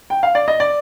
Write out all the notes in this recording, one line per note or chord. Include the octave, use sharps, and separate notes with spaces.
G5
F5
D5
D#5
D5